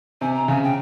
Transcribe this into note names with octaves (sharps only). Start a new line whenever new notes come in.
C3 G#5
A#5
C#3 G#5
G5